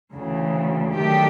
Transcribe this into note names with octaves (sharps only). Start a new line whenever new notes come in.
D2 C#3 E3
D#3 F#3 A3 D4 G4